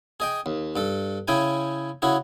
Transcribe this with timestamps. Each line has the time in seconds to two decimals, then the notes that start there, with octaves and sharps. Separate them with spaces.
0.20 G#4 D#5 G5
0.46 D#2
0.76 G2 A4
1.28 C#3 E4 G#4 G5 G#5
2.02 C#3 E4 F#4 G#4